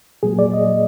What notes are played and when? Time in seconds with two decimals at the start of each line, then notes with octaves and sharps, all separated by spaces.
0.23 A#2 F#3 A#3 G#4
0.39 D5
0.54 D#5